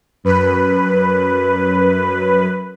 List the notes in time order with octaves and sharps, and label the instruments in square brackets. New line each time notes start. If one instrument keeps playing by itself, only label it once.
[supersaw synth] F#2 B4